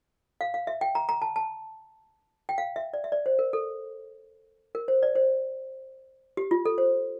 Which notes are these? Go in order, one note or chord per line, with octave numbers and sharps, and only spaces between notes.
F5
F5
E5
G5
A#5
A#5
A5
A5
G5
F5
E5
D5
E5
D5
C5
A#4
A4
A#4
C5
D5
C5
G4
F4
A4
C5